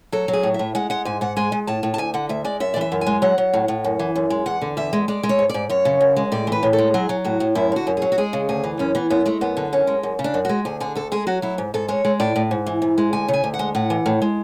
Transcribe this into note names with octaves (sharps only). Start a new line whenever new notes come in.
F#3 A4
F#3
G#4
A2
E5
A2
G#3 F#5
G#3 F#5
G#2 G#5
G#2 F#5
G#3 G#5
G#3
A2 A5
A2
A5
D2 G#5
D3 F#5
D2 E5
G#3 D5
F#2 E5
D5
E3 E5
F#2
G#5
G#3
F#3 F#5
F#3
A2
A2
F#2
E3
F#2
G#3
E2 F#5
D3
E2 E5
G#3
G#3 D5
G#3
C#5
G#2
G#2 D5
F#2 C#5
C#3
F#2
G#3
A2 D5
E3 B4
A2
A4
G#3
F#3 G#4
F#3
A2 F#4
A2
F#2 E4
D3 F#4
F#2
F#3 G#4
F#4
G#3 G#4
C#3
D2 G#4
E3
F#2 C#4
E3 B3
F#2 B3
G#3 A3
F#2 B3
D3
F#2 C#4
G#3
F#2
C#3
D4
F#2
G#3 F#4
D2 G#4
D3 G#4
D2 A4
G#3 G#4
F#3 F#4
F#3 E4
G#2
G#2 A4
G#3 C#5
G#3
A2 D5
A2
G#2
E3
G#2
G#3
D2 G#5
C#3
G#5
D2
F#5
G#3
A2 F#5
E3
A2
G#3